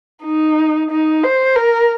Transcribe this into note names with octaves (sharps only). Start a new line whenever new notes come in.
D#4
D#4
C5
A#4